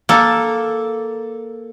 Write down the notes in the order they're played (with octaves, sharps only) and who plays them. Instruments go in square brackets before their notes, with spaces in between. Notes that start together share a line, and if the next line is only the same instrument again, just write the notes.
[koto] A#3 A4